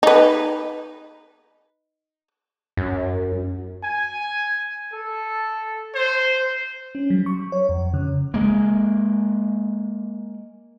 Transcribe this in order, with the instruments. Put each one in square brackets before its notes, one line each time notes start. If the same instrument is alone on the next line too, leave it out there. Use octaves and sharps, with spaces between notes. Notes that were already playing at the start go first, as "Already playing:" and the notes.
[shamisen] D#4 B4
[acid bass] F#2
[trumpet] G#5
A4
C5
[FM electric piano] C#4
F#3
C#6
C#5
F2
C#3
[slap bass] G#3 A#3